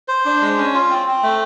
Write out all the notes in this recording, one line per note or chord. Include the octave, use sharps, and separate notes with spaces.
C5
D4
G#3
C#4
F4
C4
C4
A3